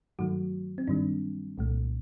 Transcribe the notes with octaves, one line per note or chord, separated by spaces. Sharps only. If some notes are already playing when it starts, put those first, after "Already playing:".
G2 D#3 F#3 A3 F#4
C4
G2 D#3 G3 D4
C2 A#2 A3